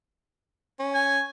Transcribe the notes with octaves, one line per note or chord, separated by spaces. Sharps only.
C#4
G#5